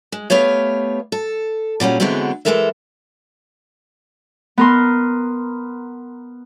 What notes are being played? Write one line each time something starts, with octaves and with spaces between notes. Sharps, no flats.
G#3
A3 B3 G4 C#5 F5
A4
A#2 F#3 G3 C#4
D3 E3 F#3 G#3 B3 C4
E3 F3 G#3 A4 A#4 E5
B3 A#4 C6